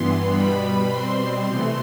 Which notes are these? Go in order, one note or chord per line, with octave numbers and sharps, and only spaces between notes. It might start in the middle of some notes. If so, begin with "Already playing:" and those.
Already playing: G2 E3 B3 C6
B2 G3 B3 B5
B5
B2 G3 C4 C6
C3 E3 A3